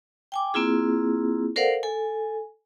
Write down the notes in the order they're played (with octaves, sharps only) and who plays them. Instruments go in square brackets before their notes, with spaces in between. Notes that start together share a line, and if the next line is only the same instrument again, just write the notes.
[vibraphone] G5 G#5 D6
A#3 C4 E4 F4 G#4
A4 A#4 C5 D5 F5 F#5
A4 G#5